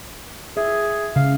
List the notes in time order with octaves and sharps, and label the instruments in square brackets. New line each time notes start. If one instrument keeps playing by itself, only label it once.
[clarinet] G#4 [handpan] E5
[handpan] C#3 [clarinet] F5